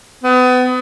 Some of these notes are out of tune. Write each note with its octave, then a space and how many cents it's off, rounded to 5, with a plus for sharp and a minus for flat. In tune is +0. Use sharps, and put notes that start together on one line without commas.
B3 +30